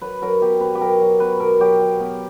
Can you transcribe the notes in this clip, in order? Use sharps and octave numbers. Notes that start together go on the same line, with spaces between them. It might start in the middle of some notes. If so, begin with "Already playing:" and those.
F#3 B4
F#3 A#4
B2 G4
B2 B4
G4
F#3 A#4
F#3
B2 B4
B2 A#4
F#3 G4
F#3
B2